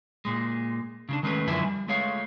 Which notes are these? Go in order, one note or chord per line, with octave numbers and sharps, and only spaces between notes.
A#2 G#3
C#3 F3 D4
D#3 G#3 A3 C#4 G4 B4
F#2 D3 F3 E4 E5 G#5
G3
G#3 A3 C#5 F5